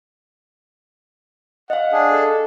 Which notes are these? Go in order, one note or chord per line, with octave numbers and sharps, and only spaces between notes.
D#5 F5 F#5
D4 G#4
A4